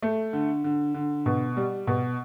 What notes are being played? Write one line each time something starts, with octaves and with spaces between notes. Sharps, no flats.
A3
D3
D3
D3
B2
G3
B2